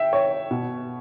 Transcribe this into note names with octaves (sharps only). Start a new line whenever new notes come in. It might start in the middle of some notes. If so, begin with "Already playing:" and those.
Already playing: E5 G5
C#5
B2